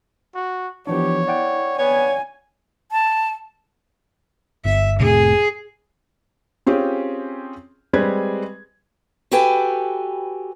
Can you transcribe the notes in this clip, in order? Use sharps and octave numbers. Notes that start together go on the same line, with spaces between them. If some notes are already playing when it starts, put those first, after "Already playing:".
F#4
E3 F3 B3 D4 G4 C#5
E4 D5 F#5 G5
B3 C#5 G#5
A5
G1 E5
F1 A2 C3 G#4
C4 C#4 F4 G4 G#4
G3 G#3 C4 B4 G#6
F#4 G4 A4 B4 G5 G#5